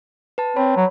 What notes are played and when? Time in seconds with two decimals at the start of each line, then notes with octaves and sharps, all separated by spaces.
0.38 B4 A5
0.56 C4 C#5 B5
0.76 F#3